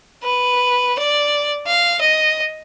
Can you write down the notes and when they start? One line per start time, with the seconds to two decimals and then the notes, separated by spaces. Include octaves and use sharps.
0.23 B4
0.98 D5
1.67 F5
2.01 D#5